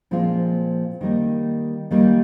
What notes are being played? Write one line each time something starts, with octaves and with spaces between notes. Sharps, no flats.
A#2 F3 G#3 C4 F4
D#3 G3 A#3 D#4
D#3 G3 A#3 D#4